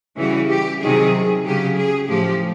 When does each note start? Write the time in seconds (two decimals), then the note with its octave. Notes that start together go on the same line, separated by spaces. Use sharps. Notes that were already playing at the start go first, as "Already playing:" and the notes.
0.17 C#3 E3 G3 F#4
0.49 G4
0.81 C3 D#3 F#3 G#4
1.44 C#3 F#3 G4
1.76 G#4
2.08 A2 F3 G4